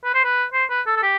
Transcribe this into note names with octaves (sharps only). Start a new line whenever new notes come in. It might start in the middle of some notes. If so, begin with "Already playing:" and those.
B4
C5
B4
C5
B4
A4
A4
G4